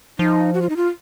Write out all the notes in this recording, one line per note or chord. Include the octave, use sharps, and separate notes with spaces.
F3 D#4
F#4
F4
D#4
F4